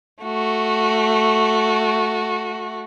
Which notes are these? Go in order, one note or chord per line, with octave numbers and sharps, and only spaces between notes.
A3 F#4